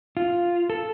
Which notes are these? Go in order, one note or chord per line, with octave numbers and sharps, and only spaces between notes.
F4
A4